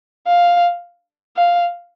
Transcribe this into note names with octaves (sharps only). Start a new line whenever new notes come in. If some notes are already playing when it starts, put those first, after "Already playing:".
F5
F5